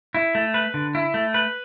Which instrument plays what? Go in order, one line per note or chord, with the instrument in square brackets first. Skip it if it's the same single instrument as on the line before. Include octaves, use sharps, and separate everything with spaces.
[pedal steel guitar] E4
A3
B4
D3
E4
A3
B4